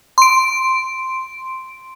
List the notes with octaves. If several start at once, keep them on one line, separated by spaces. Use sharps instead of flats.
C6 D7